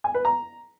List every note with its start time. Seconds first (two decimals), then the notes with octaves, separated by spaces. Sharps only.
0.04 G#5
0.15 B4
0.25 A#5